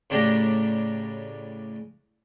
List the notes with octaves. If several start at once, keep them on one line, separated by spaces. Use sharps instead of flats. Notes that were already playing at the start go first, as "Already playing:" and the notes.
A2 C#3 D4 G4 G5 A#5